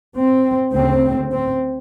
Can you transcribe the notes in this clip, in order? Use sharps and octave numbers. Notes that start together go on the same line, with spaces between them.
C4
D2 C#3 C4
C4